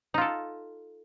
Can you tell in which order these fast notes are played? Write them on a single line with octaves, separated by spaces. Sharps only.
D#4 F4 A4